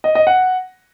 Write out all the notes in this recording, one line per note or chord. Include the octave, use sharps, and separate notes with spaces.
D#5
D#5
F#5